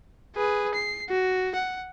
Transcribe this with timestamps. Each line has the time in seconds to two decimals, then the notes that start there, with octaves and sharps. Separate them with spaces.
0.35 G#4 B4
0.75 C7
1.09 F#4
1.55 F#5